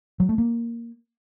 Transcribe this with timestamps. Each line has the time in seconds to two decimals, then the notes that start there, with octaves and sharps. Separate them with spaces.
0.20 F#3
0.29 A3
0.38 A#3